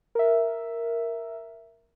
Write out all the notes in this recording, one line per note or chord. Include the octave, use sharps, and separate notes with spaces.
A#4 E5